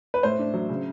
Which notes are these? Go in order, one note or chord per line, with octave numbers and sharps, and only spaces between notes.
B4
A2 C5
D4
F#3
C#3